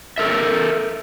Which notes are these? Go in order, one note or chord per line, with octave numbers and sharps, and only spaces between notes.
A4 A#4 E5